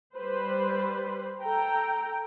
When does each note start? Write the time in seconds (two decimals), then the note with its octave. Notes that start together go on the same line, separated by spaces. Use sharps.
0.16 G3 B4 C5
1.42 A4 G5 A#5